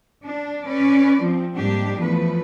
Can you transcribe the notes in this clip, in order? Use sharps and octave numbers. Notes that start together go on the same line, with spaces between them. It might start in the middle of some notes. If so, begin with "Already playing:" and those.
D4
C#4 B4 D5
F3 C4
G#2 G3 A#3 D4 G4
E2 F3 A3 B4